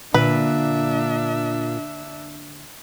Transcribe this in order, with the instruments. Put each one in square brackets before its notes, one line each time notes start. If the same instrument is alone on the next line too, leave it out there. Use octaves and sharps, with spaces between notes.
[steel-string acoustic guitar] A#2 [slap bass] D3 A#3 [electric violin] D4 E5 [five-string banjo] B4